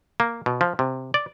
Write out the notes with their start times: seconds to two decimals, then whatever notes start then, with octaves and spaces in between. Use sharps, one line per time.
0.20 A#3
0.46 B2
0.61 F3
0.79 C3
1.14 D5